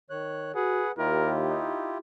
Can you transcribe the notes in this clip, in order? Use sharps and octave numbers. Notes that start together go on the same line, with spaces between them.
D#3 C#5 F#6
F#4 G#4 B4 F#5
D#2 E4 F4 G4 A#4
D#4